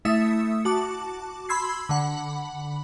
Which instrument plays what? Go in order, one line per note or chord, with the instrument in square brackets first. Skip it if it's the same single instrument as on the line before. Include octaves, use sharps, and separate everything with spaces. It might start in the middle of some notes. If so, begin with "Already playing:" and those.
[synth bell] A3 E4 E5 D#6 C#7
F#4 A5 D6
B5 C6 E6 G#6 C7
D3 F#5 B5